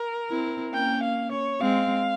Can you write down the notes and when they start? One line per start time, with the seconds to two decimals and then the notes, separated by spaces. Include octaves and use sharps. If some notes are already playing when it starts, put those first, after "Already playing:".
Already playing: A#4
0.30 C4 E4
0.73 A#3 C#4 G5
1.03 F5
1.32 C#5
1.60 G#3 C4 F5